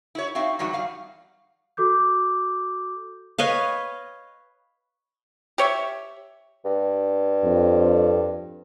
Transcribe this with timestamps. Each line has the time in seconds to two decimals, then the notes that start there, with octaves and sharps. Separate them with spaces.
0.15 E4 F#4 C#5
0.35 C4 D#4 F#4 E5 F5
0.59 E2 F#3 G3 D#4 F#4 F#5
0.73 G3 F5 F#5
1.77 F#4 A4 D6 G6
3.38 B4 C#5 D#5 F5
5.58 G4 C#5 E5
6.65 G2
7.44 F2